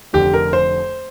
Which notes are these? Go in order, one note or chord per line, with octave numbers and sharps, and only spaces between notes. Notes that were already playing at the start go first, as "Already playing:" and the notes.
F1 F2 D3 G4
A#4
C5